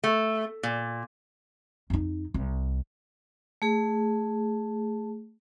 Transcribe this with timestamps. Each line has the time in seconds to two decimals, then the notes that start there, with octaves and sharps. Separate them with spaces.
0.04 A3
0.63 A#2
1.90 F2 D#4
2.34 C2
3.62 A3 G#4